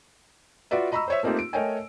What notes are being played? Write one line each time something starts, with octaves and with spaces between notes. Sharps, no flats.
F4 F#4 B4 D5 E5
D#5 A#5 B5 C#6 E6
C5 C#5 E5
A3 A#3 C4 D#4 F4 G4
D7
A3 A#4 C#5 D#5 G5 G#5